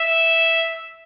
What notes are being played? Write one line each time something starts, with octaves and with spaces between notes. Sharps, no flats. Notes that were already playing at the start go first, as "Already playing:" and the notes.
Already playing: E5